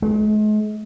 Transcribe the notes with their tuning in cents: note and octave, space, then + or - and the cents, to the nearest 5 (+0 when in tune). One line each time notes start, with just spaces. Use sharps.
G#3 +40